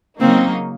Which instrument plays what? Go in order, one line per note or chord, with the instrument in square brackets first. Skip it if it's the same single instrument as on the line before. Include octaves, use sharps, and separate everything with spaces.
[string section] C#3 F#3 A#3 D#4 [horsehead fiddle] C4